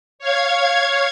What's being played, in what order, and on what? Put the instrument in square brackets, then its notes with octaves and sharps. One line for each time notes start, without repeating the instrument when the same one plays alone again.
[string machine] C#5 F5 G#6